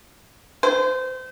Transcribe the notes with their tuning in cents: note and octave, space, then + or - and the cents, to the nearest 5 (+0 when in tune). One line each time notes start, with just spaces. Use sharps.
C5 -30